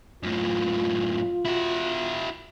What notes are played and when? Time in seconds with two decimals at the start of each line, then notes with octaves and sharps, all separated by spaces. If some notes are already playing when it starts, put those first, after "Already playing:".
0.23 F#2 A2 F4
1.45 E4 F#4